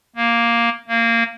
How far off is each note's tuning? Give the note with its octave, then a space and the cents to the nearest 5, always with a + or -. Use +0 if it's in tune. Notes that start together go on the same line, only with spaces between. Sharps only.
A#3 +5
A#3 -15